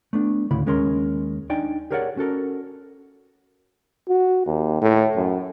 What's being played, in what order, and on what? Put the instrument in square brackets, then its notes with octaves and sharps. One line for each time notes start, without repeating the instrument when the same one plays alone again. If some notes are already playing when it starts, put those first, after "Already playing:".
[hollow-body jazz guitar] A3 B3 D4
D2 A2 C#3 E4 B5
D#2 G#3 C#4 A#4 C#5 C6
D4 D#4 D5 G5 G#5
G4 G#4 A#4 C#5 D5 F#5
C#4 F#4 A4 A#4
[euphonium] F#4
D#2
A2
F#2